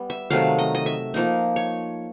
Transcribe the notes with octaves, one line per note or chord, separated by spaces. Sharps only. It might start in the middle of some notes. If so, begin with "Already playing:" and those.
Already playing: G3 B3
E5
C3 D#3 F#3 A3 F5
D#5
D#5
E5
F3 A#3 D#4
C#5